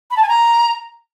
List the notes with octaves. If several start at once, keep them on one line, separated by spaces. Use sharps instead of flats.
B5
A5
G#5
A#5